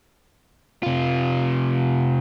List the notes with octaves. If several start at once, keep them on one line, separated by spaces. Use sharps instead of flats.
C3 F4